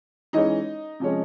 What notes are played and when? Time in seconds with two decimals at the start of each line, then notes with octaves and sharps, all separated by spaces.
0.33 E3 G#3 C#4 D#4 D#5
1.00 C3 F3 G#3 C#4